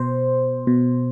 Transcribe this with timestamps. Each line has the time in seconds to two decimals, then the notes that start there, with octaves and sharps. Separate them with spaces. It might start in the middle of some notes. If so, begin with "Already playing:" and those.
Already playing: B2 C5
0.67 B2